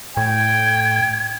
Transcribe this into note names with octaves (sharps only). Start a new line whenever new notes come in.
A2 G5 G#6